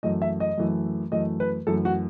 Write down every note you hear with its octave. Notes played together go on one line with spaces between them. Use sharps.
F#2 E3 A3 D#5
E5
D#5
F#2 E3 A3
F#2 E3 A3 D#5
B4
F#2 E3 A3 A4
F#4